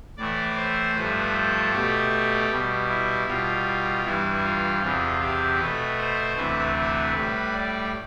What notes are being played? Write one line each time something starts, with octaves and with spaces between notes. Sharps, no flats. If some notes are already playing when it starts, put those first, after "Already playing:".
A2 E3 A3 D5
C5
G2 F3 A3 B4
A4
B2 A3 G4
B2 G3
E4
B2 G3 F4
G2 E3 G3 E4
F4
E2 C3 E3 F4
G4
B2 A3 B4
C5
D2 C3 E3 A3 B4
B4
A2 G3 B4
D5